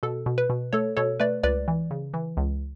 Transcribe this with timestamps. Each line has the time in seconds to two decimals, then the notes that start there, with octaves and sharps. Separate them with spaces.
0.03 B2 A4
0.26 B2
0.38 B4
0.50 B2
0.73 A3 A4 C#5
0.97 B2 A4 C#5
1.20 A3 B4 D5
1.43 C#2 B4 D5
1.68 E3
1.91 C#3
2.14 E3
2.37 C#2